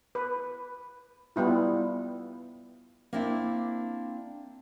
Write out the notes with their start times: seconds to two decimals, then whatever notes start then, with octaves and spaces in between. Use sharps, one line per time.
0.15 B4
1.36 G3 B3 E4 F4
3.13 A#3 C4 D4 E4